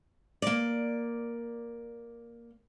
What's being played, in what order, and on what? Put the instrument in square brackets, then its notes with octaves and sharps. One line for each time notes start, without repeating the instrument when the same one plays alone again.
[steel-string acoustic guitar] A#3 D5